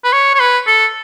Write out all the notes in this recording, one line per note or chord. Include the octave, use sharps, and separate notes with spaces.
B4
C#5
C#5
B4
A4